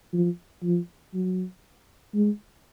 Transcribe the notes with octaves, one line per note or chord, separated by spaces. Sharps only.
F3
F3
F#3
G#3